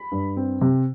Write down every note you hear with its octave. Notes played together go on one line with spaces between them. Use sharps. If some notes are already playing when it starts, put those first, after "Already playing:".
Already playing: B5
G2
C4
C3